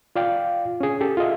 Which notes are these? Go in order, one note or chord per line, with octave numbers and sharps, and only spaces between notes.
F4 D5 F5 G5
C#4 G#4
G4 A4
F4 G#4 D#5 E5